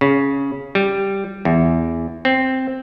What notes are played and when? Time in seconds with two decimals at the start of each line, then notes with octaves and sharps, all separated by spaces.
0.01 C#3
0.75 G3
1.45 E2
2.25 C4